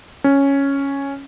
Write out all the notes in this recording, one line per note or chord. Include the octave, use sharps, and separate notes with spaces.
C#4